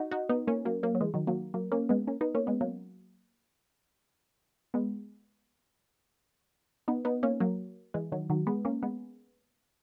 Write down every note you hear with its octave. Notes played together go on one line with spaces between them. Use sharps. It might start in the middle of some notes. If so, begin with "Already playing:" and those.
Already playing: D#4 F#4
D#4 F#4
B3 D#4
A#3 C#4
F#3 A#3
F#3 A#3
F#3
E3 G#3
D#3 F#3
F#3 A#3
F#3 A#3
A#3 C#4
G#3 B3
A#3 C#4
B3 D#4
A#3 C#4
G#3 B3
F#3 A#3
G#3 B3
B3 D#4
B3 D#4
A#3 C#4
F#3 A#3
E3 G#3
D#3 F#3
D#3 F#3
G#3 B3
A#3 C#4
G#3 B3